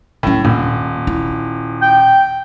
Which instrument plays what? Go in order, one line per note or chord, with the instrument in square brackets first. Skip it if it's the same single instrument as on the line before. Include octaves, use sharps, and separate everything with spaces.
[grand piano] A2 [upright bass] F#3 C#4
[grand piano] D#1 [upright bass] A#2
[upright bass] E4
[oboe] G5